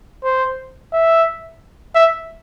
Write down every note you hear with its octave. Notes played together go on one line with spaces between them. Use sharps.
C5
E5
E5